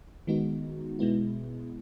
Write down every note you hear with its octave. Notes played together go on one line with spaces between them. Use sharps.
D#3 G#3 B3 D#4 F#4
B2 G#3 B3 E4